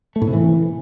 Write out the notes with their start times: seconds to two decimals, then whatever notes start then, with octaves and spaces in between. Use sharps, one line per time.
0.16 A3
0.22 A2
0.27 C3
0.33 E3